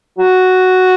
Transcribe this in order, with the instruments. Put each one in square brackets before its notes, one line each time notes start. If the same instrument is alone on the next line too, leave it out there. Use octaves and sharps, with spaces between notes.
[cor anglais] F#4